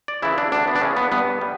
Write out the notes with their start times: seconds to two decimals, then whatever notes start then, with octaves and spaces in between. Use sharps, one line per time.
0.08 D5
0.22 C#3 E3 E4
0.38 D4
0.52 D2 D4
0.67 B3
0.76 D4
0.82 C#3 E3 C#4
0.97 B3
1.12 G2 B3
1.41 G3